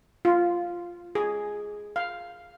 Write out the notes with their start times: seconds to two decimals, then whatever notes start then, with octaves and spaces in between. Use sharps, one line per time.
0.25 F4
1.15 G#4
1.96 F5